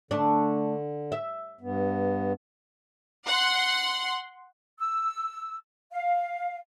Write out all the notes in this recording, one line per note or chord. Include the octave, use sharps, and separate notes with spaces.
D3 A3 D4
E5
G2 B3
F#5 C6
E6
F5